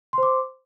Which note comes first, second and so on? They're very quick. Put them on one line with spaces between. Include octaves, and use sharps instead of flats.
C6 C5 D6